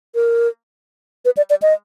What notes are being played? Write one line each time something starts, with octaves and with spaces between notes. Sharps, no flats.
A#4
B4
D5
D5
D#5